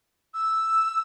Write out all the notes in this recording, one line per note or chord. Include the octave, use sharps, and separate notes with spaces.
E6